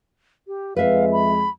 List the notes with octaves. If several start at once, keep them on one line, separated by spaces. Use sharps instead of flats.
G4
F2 G#3 B4 E5 F5
B5